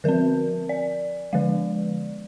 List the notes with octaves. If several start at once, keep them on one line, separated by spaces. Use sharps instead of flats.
D3 F3 C4 A#4
D5
D3 F3 G#3